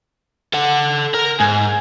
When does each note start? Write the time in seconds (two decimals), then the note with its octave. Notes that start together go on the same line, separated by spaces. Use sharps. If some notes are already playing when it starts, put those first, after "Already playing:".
0.54 A4 F#5
1.14 A#4 A#5
1.40 G#2 G#5